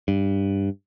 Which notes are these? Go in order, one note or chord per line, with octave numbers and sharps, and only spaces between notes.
G2